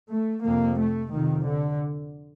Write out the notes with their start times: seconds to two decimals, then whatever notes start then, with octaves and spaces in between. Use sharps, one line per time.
0.12 A3
0.46 F2 C3 A#3
0.80 A3
1.14 F2 C3 D#3
1.47 D3